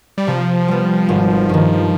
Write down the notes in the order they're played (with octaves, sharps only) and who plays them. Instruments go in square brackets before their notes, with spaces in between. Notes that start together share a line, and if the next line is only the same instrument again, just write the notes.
[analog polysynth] G3
[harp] C3 [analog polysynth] F3
[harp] G3 B3
G#1
G2 D#3